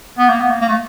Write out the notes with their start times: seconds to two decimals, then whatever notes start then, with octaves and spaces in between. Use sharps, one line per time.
0.19 B3
0.30 A#3
0.40 B3
0.51 A#3
0.61 A#3
0.69 A3